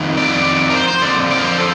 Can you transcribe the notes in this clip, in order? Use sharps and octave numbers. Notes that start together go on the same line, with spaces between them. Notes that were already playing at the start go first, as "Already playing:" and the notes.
Already playing: F2 D#3
D5
A#4
C5
C5
F2 D3 F3 D5
D5
A#4
C5
A4